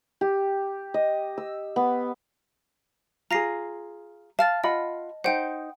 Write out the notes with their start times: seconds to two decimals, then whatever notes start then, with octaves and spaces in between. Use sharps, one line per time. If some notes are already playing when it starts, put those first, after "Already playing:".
0.21 G4
0.94 D#5
1.38 E6
1.76 B3
3.31 F4 G#4 A#5 A#6 C7
4.39 F5 A5 F6 A6
4.64 F4 D#5 F#5 B5
5.24 D#4 C5 F#5 G5